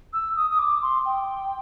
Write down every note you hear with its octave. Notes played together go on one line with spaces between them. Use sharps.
E6
D#6
D#6
D6
C6
G5